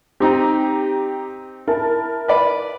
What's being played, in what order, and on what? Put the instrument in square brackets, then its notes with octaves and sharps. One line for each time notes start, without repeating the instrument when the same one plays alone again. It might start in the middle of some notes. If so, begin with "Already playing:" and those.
[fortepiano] C4 D#4 [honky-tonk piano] G4 A#5
[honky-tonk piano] E4 A#4 A5
[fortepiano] B4 D5 B5